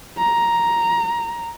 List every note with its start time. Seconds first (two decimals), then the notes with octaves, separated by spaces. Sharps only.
0.18 A#5